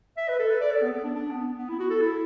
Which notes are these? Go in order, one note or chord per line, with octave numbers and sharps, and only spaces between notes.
E5
B4
A4
B4
D5
A4
B3
B3
D4
D4
B3
B3
E4
F#4
A4
E4